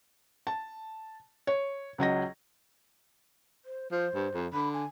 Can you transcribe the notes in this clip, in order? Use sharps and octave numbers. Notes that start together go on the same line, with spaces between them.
A5
C#5
C#2 F#3 D#5 A#6
C5
F3 C5
G2
F2
D3 B5
G#5